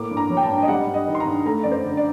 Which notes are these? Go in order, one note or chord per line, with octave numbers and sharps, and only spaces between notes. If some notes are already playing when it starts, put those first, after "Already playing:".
Already playing: A2 A#3 D6
G2
A#5
F#3
G5
A5
G2
D#5
G3 F#5
G2
D#5
D#3
C6
A#5
G2
A3 A#5
F#2 D5
C5
D3
D5